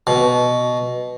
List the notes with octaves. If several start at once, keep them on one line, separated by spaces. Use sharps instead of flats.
B2